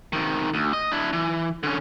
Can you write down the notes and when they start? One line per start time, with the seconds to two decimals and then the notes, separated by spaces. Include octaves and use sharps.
0.13 C3 D#3
0.54 D2
0.73 D#5
0.92 D4 E4
1.13 E3
1.63 D3 C#4